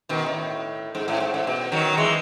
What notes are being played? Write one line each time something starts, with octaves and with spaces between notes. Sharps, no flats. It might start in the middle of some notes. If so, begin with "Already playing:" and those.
B2 D#3
A2
G#2
A2
G#2
A2
B2
D#3 F#3
E3 G#3